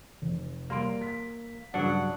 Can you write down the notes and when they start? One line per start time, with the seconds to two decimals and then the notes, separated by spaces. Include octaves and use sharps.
0.22 F1
0.70 G3 A#3 C6 D7
1.01 B6
1.74 G2 C#3 F#3 D4 F#5